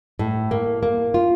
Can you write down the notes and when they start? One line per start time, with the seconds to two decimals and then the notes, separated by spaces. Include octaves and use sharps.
0.19 A2
0.51 A#3
0.83 A#3
1.14 F4